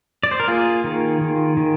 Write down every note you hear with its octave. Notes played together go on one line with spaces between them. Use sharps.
D5
C5
A#4
A#3 F4 G#4
D#3
D#3
D#3